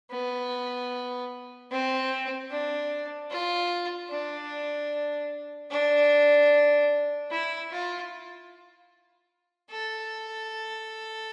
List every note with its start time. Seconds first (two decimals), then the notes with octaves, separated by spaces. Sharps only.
0.11 B3
1.71 C4
2.50 D4
3.30 F4
4.10 D4
5.71 D4
7.30 E4
7.71 F4
9.70 A4